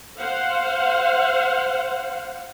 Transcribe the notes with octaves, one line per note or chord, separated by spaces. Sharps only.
C5 F5 F#5